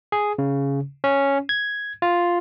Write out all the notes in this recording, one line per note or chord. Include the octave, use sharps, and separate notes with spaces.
G#4
C#3
C#4
G#6
F4